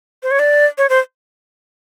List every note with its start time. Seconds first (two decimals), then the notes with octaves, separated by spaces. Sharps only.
0.23 C5
0.31 C#5
0.39 D5
0.78 C#5
0.89 C5